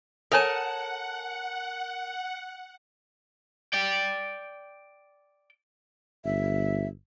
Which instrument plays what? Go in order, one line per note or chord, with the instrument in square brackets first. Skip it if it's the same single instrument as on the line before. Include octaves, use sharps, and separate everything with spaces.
[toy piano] A4 C#5 [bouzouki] A#4 G#5 A5 [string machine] F#5
[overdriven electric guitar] D5 G5
[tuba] G1 [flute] E5